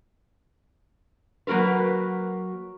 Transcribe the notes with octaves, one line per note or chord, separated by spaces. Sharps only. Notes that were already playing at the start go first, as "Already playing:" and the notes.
F#3 A#3 F#4 A#4 B4